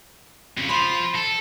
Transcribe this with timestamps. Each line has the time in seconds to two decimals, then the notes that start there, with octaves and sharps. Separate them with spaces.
0.57 F2 C#3
0.69 F3 F4 C5 B5
1.15 A4